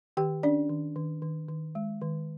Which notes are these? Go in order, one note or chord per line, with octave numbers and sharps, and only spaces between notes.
D#3 G4 G5
C#4 D4 D5
D#3
D#3
D#3
D#3
G#3
D#3